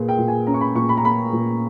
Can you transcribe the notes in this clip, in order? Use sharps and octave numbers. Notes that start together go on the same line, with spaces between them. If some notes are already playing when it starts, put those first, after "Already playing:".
Already playing: A#2 A#3 G#4 B4
G5
A#2
G#5
C#4 A#5
C#6
B5
A#2 C#6
B5
A#5
A#3 B5
A#2